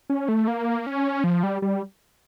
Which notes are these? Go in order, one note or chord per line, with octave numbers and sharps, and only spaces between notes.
C#4
A3
A#3
C#4
F3
G3
G3